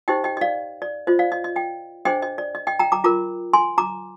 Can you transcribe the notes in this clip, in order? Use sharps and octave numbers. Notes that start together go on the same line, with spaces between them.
D#4 G4 C5 D#5 G5
D#5 G5
D#5
D5 F5
D5
F4 C5 D#5
D5 F5
D#5
D#5
D#5 G5
D4 G#4 C5 D#5 G5
D#5
D5
D#5
D#5 G5
G5 A#5
A#5 D6
F4 A#4 A#5 D6
G#5 C6
A#5 D6